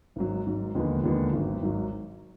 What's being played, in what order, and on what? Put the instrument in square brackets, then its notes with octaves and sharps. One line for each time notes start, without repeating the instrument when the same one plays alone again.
[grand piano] G#1 G#2 F#3
G#1 G#2 F#3
D#2 D3 F3 G#3 B3
D#2 D3 F3 G#3 B3
G#1 G#2 F#3
G#1 G#2 F#3